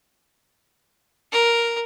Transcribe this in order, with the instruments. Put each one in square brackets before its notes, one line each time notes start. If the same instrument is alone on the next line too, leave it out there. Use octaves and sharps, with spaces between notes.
[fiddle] A#4